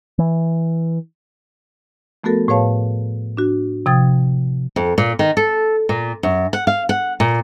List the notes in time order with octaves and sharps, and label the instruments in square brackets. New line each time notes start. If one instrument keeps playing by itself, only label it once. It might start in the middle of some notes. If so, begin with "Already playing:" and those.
[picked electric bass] E3
[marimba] F3 A3 B3 F#4 A4 A#4
A2 G#4 B4 C#5 F5 A5
D4 F#4
C3 F3 G5 D#6 G#6 A6
[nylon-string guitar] F2
A#2
D#3
A4
A#2
F#2
F#5
F5
F#5
A#2